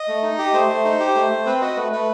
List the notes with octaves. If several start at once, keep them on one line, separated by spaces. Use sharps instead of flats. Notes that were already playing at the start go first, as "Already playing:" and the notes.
Already playing: D#5
A3
D#4
G4
A3 C5
A3
D#4
G4
A3
A3
C4 B4
F#4 D#5
A3 B4
A3 B4